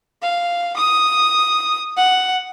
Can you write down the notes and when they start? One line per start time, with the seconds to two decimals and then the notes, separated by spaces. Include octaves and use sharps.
0.23 F5
0.77 D#6
1.97 F#5